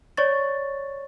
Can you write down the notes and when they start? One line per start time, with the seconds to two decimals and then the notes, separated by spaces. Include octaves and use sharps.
0.17 C#5 D5 C#6 A6